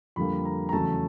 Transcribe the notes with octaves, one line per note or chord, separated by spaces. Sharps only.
F2 D3 G3 A#3 B5
A#5
A#5
E2 C#3 F#3 A3 A5